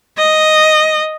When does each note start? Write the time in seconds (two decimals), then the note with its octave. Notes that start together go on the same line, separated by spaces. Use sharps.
0.18 D#5